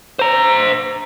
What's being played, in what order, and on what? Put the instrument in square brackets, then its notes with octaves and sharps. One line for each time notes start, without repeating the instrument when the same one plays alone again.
[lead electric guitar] C5 A#5